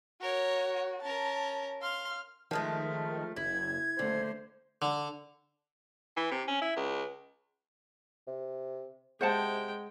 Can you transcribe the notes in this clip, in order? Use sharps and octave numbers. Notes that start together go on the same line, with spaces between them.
F#4 A#4 C#5
C#4 A#4 A5
F5 C6 F6
D#3 F3 G#3 A3 F6
F#1 E4 G#6
D#1 D3 A3 C5
D3
E3
C3
C#4
E4
C#2
C3
C3 G#3 C5 F#5 G5 A5